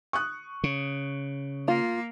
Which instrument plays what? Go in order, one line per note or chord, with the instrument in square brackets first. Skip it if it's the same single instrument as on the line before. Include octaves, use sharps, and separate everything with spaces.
[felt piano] C#6 D#6 F#6
[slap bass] C#3
[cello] A#3 [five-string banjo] F4